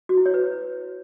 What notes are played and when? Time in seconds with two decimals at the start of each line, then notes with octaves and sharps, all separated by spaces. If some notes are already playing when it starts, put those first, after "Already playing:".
0.09 F#4
0.17 E4
0.26 C#5
0.34 B4